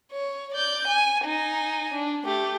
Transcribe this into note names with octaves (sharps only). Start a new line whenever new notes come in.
C#5
D5 G6
G#5
D#4 G#5
D4
A3 G4